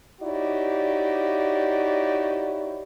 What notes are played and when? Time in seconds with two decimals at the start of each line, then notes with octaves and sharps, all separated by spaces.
0.22 D#4 E4 F#4 G4 C#5 D5